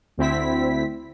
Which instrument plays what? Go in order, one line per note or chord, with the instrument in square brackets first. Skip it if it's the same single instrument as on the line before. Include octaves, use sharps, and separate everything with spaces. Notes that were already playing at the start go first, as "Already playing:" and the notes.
[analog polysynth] D2 C4 E4 B6